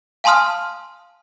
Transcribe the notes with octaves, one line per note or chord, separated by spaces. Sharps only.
F5 G#5 A5 C6 D#6 F6